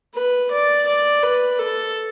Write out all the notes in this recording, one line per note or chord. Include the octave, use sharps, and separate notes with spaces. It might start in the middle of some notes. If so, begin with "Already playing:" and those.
B4
D5
D5
B4
A4